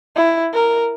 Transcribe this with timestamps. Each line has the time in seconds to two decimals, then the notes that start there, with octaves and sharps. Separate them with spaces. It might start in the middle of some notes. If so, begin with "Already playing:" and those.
0.16 E4
0.54 A#4